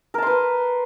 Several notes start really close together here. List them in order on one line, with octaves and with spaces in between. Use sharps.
A#4 A5 C6 B4